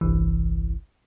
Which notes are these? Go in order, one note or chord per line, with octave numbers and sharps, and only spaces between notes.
G1 C2 E3